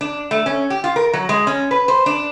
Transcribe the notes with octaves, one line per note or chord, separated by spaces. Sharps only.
D4
A3
C#4
G4
F4
A#4
F#3
G#3
C#4
B4
C5
D4